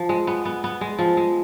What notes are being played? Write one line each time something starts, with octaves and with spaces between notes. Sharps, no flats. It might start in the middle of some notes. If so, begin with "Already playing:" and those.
Already playing: F3
G#3
B3
B3
B3
G#3
F3
G#3